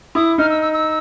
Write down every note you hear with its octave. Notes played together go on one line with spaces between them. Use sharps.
E4 D#6
D#4 F6
E6
E6
E6